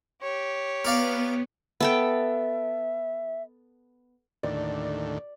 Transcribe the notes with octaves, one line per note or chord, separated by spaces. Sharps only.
G4 C#5
B3 A#4 D5 F5
B3 A4 E5 G5
D#2 A2 D3 D5